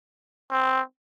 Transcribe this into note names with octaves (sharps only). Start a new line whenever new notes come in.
C4